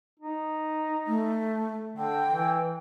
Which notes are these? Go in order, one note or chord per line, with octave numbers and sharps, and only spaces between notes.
D#4
A3
D3 G5
E3